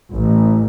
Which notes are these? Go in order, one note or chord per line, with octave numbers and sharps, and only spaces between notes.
A1